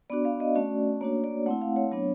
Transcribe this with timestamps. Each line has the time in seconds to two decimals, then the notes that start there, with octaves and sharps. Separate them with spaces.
0.10 B3 D4 F#4 D5
0.25 F5
0.40 D#5
0.55 A3 C#4 F#4 D5
1.01 A#3 D4 F#4 C#5
1.24 D5
1.46 A3 C4 E4 F#5
1.62 F5
1.76 C#5
1.92 F#3 B3 D4 C#5